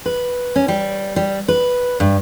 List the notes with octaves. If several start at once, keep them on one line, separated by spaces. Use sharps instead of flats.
B4
C#4
G3
G3
B4
G2